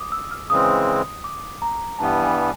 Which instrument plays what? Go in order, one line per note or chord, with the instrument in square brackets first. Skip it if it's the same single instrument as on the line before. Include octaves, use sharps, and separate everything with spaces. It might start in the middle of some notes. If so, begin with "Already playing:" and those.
Already playing: [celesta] D6 D#6
E6
F6
[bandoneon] C#3 E3 G#3 C4 [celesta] D#6
[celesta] D6
A#5
[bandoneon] G2 E3 G3 B3 [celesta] A5
[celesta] G#5